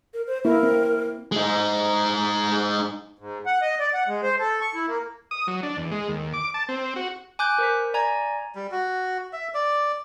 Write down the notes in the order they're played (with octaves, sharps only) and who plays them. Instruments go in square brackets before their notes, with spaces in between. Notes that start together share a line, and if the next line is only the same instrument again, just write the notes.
[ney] A#4
C5
[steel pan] A#3 E4 [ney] A#4
[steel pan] C4
[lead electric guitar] G#3 D#4
[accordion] G#2
F#5
D#5
D5
F#5
G#3
C5
A4
C#6
E4
A#3
[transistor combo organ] D#6
F#3
D4
E2
G#3
D#2
D6
A5
C4
F#4
[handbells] G#5 D6 F#6 G6
A#4 C5 B6
D5 G#5 A#5 G#6
[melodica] G3
F#4
E5
D5